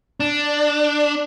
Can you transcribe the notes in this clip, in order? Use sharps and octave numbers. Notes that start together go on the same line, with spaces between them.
D4